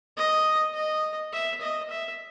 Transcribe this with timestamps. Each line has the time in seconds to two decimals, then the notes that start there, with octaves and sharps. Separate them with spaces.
0.17 D#5
0.74 D#5
1.33 E5
1.61 D#5
1.90 E5